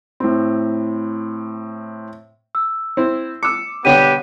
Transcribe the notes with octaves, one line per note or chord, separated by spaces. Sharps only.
A2 C4
E6
C4 E4 C5
D6 E6 C#7
B2 D3 G3 B3 G4 C#5 G5 D#7